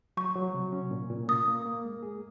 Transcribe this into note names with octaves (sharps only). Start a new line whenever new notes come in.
F#3 C#6
F#3
C3
C#4
A#2
A#2
A#3 D#6
A#3
A#3
G#3
G#4